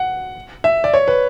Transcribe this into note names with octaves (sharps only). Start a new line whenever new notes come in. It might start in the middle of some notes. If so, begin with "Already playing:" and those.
Already playing: F#5
E5
D5
C#5
B4